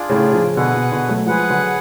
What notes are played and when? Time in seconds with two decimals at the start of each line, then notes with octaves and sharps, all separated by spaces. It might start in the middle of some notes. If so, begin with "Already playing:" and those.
Already playing: D4 F4 G#4 D5
0.09 A2 C#3
0.33 C#3 F3
0.57 B2 D3 G#4 B4 F#5
0.74 B2
0.92 B2 D3
1.09 F#3 A3
1.26 F3 G#3 G#4 B4 F#5
1.50 D3 F#3